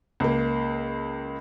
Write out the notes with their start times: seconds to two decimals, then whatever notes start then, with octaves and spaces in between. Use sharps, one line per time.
0.20 C#2 A#3